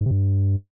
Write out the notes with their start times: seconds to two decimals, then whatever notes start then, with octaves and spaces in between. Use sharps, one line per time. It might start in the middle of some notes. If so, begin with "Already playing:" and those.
0.01 G#2
0.06 C3
0.11 G2